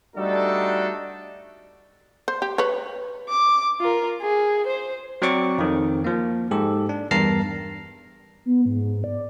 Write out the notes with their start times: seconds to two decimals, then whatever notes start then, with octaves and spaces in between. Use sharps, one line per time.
0.16 G3 A3 D4 D#4 F#4 A4
2.28 C5
2.42 G4
2.58 B4 C#5
3.29 D6
3.80 F4 A#4
4.22 G#4
4.67 C5
5.22 F#3 C4 D5 C#6 D6
5.58 F2 D#3
6.04 F3 A#3
6.51 G#2 G4 A4
6.89 D4
7.11 E2 G2 A#4 A5 A#5 C7
8.45 B3
8.65 G#2
9.04 D5